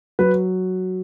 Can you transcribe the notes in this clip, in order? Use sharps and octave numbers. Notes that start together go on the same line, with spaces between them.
F#3 B4